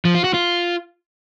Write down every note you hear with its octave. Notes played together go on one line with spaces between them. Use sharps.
F3
F4
F#4
F4